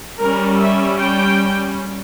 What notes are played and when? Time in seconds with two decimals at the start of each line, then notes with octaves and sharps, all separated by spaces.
0.20 G3 C#4 A#4
0.60 E5
1.00 G5